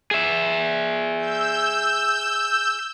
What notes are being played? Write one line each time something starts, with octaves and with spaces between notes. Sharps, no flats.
G#4 E5
E6 G6